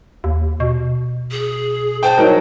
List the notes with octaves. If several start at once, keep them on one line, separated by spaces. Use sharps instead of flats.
D#2
B2
G#4
C5 G5 A5
F#3 D#4 A#4